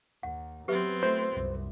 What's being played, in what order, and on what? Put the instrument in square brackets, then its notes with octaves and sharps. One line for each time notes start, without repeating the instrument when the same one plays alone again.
[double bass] D#2 [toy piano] F#5
[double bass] F#3 [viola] B3 C4 [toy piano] G4 B4 E5
[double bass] A3 [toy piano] F4 [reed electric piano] C5
[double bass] C2 F#2